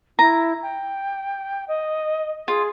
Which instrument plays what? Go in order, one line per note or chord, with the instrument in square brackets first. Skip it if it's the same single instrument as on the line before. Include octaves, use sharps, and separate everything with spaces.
[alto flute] E4 [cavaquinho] A#5
[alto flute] G5
D#5
[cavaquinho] F4 [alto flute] G#4